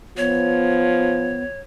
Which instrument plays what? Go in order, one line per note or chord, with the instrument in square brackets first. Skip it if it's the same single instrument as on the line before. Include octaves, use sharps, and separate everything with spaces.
[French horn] F3 [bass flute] B3 [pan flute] C#5